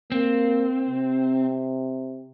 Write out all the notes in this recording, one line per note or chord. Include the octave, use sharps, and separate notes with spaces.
A#3 C4
C3